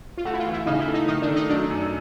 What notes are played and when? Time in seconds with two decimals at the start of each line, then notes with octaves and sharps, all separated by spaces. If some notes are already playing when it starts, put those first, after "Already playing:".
0.18 F4
0.25 A3 F#4
0.33 E4
0.39 F4
0.46 E3
0.53 E4
0.66 C#3 D#4
0.80 E4
0.88 A3
0.94 D#4
1.08 D#3 D#4
1.22 D4
1.29 A3
1.36 D#4
1.49 F#3 D4
1.70 F#2